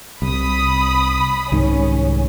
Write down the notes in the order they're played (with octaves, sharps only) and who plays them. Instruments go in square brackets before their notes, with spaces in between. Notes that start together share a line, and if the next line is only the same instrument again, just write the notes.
[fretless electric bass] C2 [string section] B5 D#6
[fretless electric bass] C2 G#2 D#3 [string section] C#4